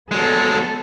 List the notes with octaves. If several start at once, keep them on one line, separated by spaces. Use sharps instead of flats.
F#3 G#3 B3 A4